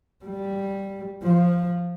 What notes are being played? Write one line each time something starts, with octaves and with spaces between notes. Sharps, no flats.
G3
F3